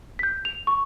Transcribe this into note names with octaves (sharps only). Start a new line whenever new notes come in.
G6 B6
F7
C#6